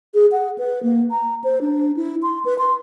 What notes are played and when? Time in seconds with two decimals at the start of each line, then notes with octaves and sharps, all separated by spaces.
0.14 G#4
0.32 F#5
0.58 B4
0.83 A#3
1.11 A#5
1.44 C5
1.61 D4
1.97 E4
2.23 C6
2.45 B4
2.59 C6